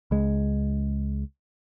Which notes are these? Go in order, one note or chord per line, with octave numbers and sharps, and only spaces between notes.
C#2 G#3